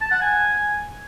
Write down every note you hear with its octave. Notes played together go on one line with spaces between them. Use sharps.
A5
F#5
G#5